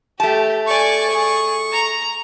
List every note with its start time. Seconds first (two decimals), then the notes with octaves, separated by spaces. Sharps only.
0.20 A3 G4 A5
0.67 D5 G#5 C#6
1.10 G#4
1.73 A#5